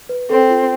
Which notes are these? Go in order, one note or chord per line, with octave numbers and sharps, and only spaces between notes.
B4
C4 A4
F4